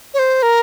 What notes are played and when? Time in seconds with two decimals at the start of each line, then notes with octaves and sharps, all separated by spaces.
0.14 C#5
0.19 C5
0.42 A#4